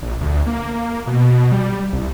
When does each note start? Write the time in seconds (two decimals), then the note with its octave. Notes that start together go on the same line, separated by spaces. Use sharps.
0.02 A#1
0.21 D2
0.47 A#3
1.07 B2
1.52 G3
1.93 C2